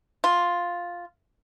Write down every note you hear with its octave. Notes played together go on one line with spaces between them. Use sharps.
F4